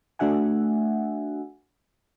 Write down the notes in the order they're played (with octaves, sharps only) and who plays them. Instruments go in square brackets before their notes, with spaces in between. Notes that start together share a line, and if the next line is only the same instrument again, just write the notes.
[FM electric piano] A3 D4 F#4 E5 F#5 G#5